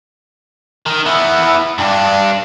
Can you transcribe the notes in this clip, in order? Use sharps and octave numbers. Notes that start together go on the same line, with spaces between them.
D#3
E3 B3
G2 D4